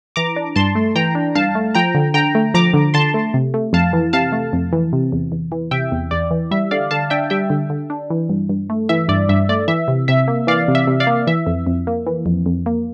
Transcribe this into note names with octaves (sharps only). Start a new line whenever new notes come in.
E3 A#5 D6
D4
G2 A5 C6
A3
E3 G5 A#5
D4
G2 F5 A5
A3
F3 G5 A#5
D3
D3 G5 A#5
A3
F3 A#5 D6
D3
D3 A5 C6
A3
C3
A3
F2 F5 A5
E3
C3 F5 A5
A3
F2
E3
C3
E2
E2
E3
C3 E5 G5
E2
E2 D5
E3
G3 E5
D3 D5 F5
D3 F5 A5
D4 E5 G5
G3 E5 G5
D3
D3
D4
E3
G2
G2
A3
E3 E5
G2 D5
G2 E5
A3 D5
E3 E5
C3
C3 E5
A#3
E3 D5 F5
C3
E5
C3
D5 F5
A#3
E3 E5
F2
F2
A#3
E3
F2
F2
A#3